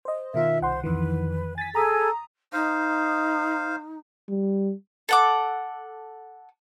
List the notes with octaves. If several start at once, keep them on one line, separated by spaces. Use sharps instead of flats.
C5 D#5
B2 D#3 F4 A#4 E5
C2 C5 F#5 C6
F2 D#3 E3 B4
G#5 A6 B6
G#4 A4 G#5 A#5 D#6
D#4 C5 F5
G3
A4 F#5 D6